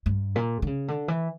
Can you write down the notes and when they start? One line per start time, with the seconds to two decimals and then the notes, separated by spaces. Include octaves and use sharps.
0.06 G2
0.36 A#2
0.62 D3
0.67 C#3
0.88 D3
1.08 E3